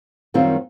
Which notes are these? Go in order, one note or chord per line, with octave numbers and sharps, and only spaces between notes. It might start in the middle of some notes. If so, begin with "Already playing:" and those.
F#2 D#3 G3 C4 F4